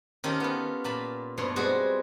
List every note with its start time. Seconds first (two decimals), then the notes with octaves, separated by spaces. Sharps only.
0.24 D#3 C#4 F4 G4 A4
0.40 B3 F4
0.84 A#2 A5 B5
1.38 G2 B2 A3 C#5 C6
1.56 G3 G#3 C4 F#4 G#4